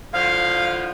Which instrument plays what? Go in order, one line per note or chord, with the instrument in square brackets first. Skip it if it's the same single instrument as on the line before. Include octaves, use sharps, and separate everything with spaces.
[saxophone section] A2 D3 F3 [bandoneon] F5